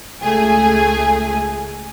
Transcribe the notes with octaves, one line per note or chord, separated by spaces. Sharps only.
C#2 A3 G#4 G#5